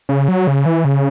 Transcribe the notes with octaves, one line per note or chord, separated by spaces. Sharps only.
C#3
F#3
C#3
E3
C#3